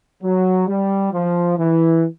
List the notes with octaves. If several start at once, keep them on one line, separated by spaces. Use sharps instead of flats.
F#3
G3
F3
E3